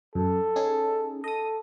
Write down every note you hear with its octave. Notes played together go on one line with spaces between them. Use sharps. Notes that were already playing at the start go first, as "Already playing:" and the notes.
F#2 A4
C#4 D#4 G#4
A4 D#5 D#6